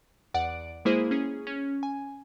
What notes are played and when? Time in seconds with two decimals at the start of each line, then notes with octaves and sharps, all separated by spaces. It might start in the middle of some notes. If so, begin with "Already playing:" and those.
0.34 E2 D5 F#5 D7
0.85 G#3 A#3 E4 G#4 C5 D#7
1.11 C#4 G#4
1.47 C#4
1.83 G#5